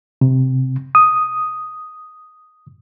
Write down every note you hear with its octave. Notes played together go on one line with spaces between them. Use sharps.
C3
D#6